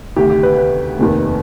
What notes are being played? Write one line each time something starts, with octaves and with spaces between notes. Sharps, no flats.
D2 C3 D#3 G4
G4
B4
B4
F1 D#2 D#3